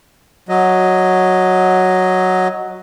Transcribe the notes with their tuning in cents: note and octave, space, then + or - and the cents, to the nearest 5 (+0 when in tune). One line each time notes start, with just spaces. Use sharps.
F#3 +0 D#5 +0